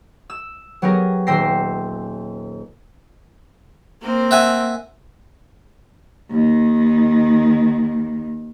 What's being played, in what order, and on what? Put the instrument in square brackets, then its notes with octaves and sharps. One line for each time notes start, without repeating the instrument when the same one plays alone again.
[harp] E6
F#3 B3 G4 G#4 A#4
D#1 G5 C6 E6 A#6 C7
[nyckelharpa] A#3 C4
[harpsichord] E5 F#5 G#5
[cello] D#2 D#3